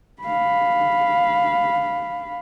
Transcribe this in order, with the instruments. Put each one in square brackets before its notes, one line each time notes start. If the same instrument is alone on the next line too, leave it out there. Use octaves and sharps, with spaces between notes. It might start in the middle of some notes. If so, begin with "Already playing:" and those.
[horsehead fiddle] F5 B5